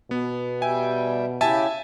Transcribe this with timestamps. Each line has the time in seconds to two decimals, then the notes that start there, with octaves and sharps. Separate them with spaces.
0.11 B2 B3
0.62 G3 E5 G5 G#5
1.41 C#3 E4 G4 E5 G#5 A5